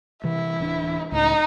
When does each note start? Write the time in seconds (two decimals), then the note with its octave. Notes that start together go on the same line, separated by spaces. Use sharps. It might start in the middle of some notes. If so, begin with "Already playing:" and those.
0.24 C3 E3 E4
0.60 D1 E3 D4
1.12 C#2 A2 D#4